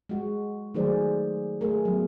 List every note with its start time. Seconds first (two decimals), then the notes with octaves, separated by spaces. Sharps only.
0.09 G#3 F#4
0.74 D#3 F#3 A3 G#4 C5 D5
1.61 A3 G#4 A#4
1.85 F#3 B3